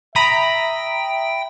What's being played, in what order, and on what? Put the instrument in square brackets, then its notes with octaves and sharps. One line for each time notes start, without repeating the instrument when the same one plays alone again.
[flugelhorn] E5 [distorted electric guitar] G5 [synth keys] A#5 B5 D#6